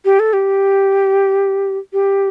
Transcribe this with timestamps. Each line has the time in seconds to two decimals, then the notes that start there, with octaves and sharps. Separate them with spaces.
0.05 G4
0.19 A4
0.33 G4
1.93 G4